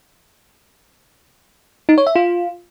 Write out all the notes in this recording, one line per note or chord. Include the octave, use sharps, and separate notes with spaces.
D#4
C#5
E5
F4